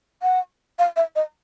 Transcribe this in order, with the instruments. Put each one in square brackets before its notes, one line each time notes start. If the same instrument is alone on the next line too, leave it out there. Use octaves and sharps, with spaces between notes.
[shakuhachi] F#5
F5
E5
D#5